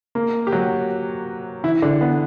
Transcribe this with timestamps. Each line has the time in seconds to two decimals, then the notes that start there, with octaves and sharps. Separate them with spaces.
0.15 A#3
0.47 G4
0.52 F#3 F#4
1.64 E3 E4
1.82 D3 D4
2.01 B3